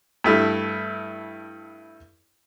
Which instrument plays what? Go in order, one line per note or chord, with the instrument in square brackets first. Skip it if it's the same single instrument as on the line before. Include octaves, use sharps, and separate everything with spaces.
[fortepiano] G2 A3 E4